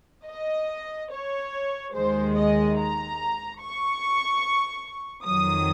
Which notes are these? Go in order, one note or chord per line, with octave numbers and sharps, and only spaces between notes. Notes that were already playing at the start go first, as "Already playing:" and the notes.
D#5
C#5
D#2 D#3 G#3 C5
D#5
A#5
C#6
F2 D#3 F#3 D#6